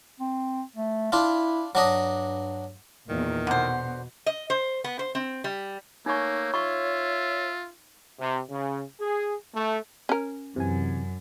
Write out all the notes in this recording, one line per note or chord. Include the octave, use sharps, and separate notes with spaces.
C4
A3
D4 E4 F4
G2 F#3 D4 D#5
E2 A#2 D#3
B2 D3 C5 F#5
D#5
C5
B3
C5
C4
G3
A3 A#3 D#4 C#5 C#6
F4 E5 C#6
C3
C#3
G#4
A3
C#4 A#4
F#2 C3 E3 G#5